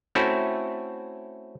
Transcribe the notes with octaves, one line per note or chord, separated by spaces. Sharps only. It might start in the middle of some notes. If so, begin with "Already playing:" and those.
A3 C4 C#4 E4 F#4 A4